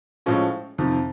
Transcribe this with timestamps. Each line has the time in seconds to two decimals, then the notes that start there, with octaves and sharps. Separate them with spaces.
0.26 A2 F3 G#3 C#4 F4
0.78 F2 C3 D#3